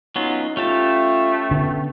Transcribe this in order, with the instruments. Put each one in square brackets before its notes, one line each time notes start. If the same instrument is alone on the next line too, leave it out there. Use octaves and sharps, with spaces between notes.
[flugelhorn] F#3 [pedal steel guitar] B3 C#4 F4 [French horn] D#4
[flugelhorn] A3 [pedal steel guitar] C#4 G4 A5 [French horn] F4
[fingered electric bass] D3 [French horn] B3